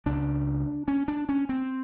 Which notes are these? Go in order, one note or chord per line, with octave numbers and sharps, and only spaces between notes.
C#2 C#3 D4
C#4
D4
C#4
C4